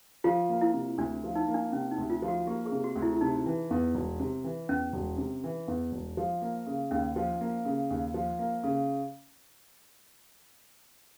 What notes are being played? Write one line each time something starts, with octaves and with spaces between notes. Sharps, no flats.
F3 F4
A#3
E4
C3
D2 D4
F3
D#4
A#3
D4
C3 C#4
D#4
D2
F4
F3
F#4
A#3 G4
G#4
C3
F#4
D2
E4
E4
C3 D#4
E3
E2
E1
C3
E3
E2 C#4
E1
C3
E3
E2
E1
F3
A#3
C#3
D#2 C#4
F3
A#3
C#3
D#2
F3
A#3
C#3